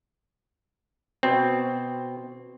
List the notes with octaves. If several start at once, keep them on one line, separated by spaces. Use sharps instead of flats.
B2 C4